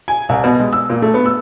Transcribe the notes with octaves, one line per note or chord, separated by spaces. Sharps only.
G#5
C2
B2
G#3
E6
A#2
A3
B3
E6